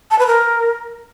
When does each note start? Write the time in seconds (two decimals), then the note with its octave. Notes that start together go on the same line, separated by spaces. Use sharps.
0.11 A5
0.19 B4
0.27 A#4